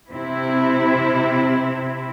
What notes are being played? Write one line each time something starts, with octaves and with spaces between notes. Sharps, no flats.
C3 C4 E4